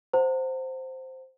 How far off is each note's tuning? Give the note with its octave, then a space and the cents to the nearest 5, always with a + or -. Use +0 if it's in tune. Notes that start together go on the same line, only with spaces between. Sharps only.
C5 +0 F#5 +0 A#5 -45